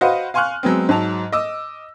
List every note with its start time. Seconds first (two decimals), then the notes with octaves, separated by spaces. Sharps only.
0.01 F#4 B4 C5 D#5 F5 F#5
0.34 F5 G#5 C6 C#6 F6 F#6
0.63 F#3 G#3 B3 C4
0.89 G#2 F#3 A5 F7
1.32 D#5 D6 E6